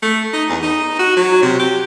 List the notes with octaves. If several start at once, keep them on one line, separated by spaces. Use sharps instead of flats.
A3
D#4
E2
D#4
F#4
F#3
C3
G4